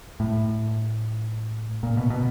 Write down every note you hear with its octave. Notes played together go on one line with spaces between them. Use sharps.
A2
A#2
B2
B2